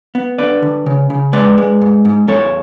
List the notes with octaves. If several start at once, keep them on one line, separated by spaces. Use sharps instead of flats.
B3
D3 B4 D5
D3
C#3
C#3
G#3 B4 D5
G#3
G#2
G#2
E2 A4 C#5